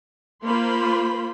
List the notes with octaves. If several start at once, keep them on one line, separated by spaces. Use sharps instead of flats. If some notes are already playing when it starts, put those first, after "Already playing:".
A#3 F4 C5 B5 C6